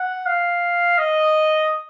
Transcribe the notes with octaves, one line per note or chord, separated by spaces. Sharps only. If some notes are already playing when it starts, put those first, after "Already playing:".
Already playing: F#5
F5
D#5